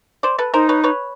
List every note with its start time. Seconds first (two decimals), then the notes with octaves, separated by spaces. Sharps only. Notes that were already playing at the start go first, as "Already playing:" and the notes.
0.23 C5 D5
0.38 A4 B4
0.54 D#4 A#4 C5
0.69 B4 C#5
0.84 B4 C#5